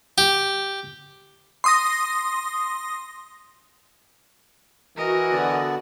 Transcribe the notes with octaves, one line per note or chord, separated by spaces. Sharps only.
G4
C6 D#6 A#6
E3 F#4 A#4 D#5
D3 B3 D5